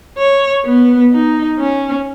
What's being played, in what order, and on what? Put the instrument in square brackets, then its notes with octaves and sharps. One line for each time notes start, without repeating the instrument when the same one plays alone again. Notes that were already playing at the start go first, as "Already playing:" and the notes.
[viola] C#5
B3
D#4
C#4